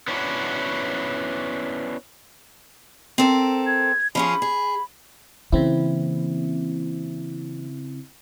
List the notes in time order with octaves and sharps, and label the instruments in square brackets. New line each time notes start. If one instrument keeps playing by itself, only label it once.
[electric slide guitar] B3 C#4 D4 E4 F#4
[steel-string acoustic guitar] C4 A4 A#4
[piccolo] G#6
[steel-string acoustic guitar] F3 C#4 G#4 [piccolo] B5
[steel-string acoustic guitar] G#4
[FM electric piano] C#3 C4 E4 [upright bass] E3 A#3